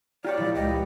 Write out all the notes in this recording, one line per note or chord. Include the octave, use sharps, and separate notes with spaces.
F4 G4 C#5 D5 A#5 A6
A#2 F3 G#3 E4
C#2 G4 D#5
B5